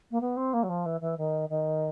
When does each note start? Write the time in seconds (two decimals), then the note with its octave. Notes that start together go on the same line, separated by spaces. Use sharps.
0.11 A#3
0.21 B3
0.36 C4
0.53 A#3
0.63 F#3
0.69 F3
0.85 E3
1.01 E3
1.17 D#3
1.49 D#3